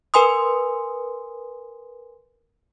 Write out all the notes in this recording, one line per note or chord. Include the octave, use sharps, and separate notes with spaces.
A#4 B4 G#5 C6 D#6